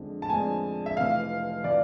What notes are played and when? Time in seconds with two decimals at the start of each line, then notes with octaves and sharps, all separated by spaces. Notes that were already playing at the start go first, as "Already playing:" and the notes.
Already playing: F2 D3 G#3
0.22 A5
0.30 F2 D3 G#3 G#5
0.86 E5
0.97 F1 F2 E3 F5
1.64 E3 D5